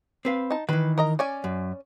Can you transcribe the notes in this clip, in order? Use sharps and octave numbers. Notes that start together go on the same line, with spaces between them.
C4 B4 F5
D#4 A5
D#3 E3 B4
A#4 D#5 A#5
C#4 D5 G#5
F#2